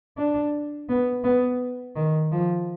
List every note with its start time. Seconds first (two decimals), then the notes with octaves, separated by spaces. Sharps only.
0.18 D4
0.89 B3
1.24 B3
1.96 D#3
2.32 F3